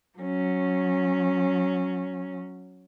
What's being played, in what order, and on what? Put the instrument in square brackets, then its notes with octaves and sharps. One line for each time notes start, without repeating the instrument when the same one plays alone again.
[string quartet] F#3 C#4